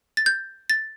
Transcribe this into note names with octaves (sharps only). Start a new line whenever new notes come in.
A6
G6
A6